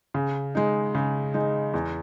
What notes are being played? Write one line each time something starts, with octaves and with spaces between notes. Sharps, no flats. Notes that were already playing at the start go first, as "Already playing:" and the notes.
C#3
G#3 D#4
C#3
G#3 D#4
E2